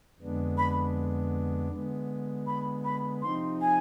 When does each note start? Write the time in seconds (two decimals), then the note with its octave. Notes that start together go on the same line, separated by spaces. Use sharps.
0.19 F2 D3 G#3 B3 D4
0.58 B5
1.71 D3 G#3 B3
2.47 B5
2.85 B5
3.22 C3 F3 C4 D#4 C6
3.61 G#5